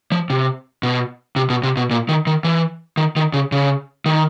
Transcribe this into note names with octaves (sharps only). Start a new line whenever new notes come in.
F3
C3
B2
C3
B2
C3
B2
A#2
D#3
D#3
E3
D#3
D#3
C#3
C#3
D#3